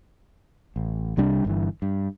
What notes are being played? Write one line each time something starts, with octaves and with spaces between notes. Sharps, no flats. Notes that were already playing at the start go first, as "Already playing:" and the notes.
A1
C2 C3 G3 D4
G1 G2 E3
G2